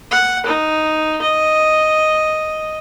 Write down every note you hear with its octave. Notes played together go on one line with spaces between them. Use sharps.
F#5
D#4
D#5